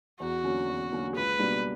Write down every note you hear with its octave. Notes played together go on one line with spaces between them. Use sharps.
E2 F#4
D3 F#3 A#3 C#4
E2
D3 F#3 A#3 C#4
C#2 B4
B2 G3 A#3 D4